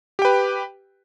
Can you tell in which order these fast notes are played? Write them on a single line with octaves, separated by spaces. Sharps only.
G4 G5 B4